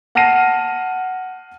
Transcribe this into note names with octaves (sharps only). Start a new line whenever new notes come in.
F#5 A5 F6 A#6 C7 D#7